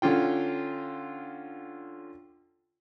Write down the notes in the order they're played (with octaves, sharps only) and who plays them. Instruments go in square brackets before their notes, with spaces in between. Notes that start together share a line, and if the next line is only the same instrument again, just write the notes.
[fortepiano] D3 C#4 F4 G5